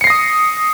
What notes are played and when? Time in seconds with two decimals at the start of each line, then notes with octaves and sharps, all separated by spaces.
0.01 C#7
0.04 C7
0.07 A#6
0.10 D#6